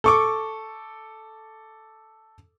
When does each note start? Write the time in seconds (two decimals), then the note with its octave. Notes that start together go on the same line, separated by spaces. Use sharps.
0.04 A4 C#6 D6